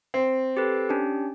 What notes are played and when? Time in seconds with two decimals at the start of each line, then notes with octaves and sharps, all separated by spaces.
0.14 C4
0.57 G4 A4 B4
0.89 C#4 D4 G4